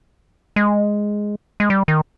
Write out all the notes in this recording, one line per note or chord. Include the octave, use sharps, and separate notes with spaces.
G#3
G#3
G3
D#3